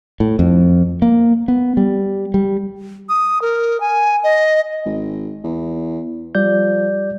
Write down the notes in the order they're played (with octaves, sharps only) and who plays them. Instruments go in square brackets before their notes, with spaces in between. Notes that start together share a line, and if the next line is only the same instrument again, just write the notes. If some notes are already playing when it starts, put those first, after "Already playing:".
[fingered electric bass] A2
F2
A#3
B3
G3
G3
[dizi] D#6
A#4
G#5
D#5
[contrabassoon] G#1
E2
[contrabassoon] F3 [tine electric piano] G3 D5 G6